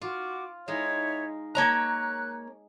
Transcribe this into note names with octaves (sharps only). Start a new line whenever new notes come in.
F4 F#4 D6
G#3 D#4 E4 C#5 E5
A#3 C#5 A#5 F#6